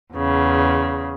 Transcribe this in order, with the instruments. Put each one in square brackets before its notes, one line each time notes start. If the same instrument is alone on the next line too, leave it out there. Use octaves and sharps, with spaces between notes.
[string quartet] E2 C#3